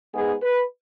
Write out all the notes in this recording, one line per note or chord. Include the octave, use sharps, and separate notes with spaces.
G#2 G#3 B3 G#4
B4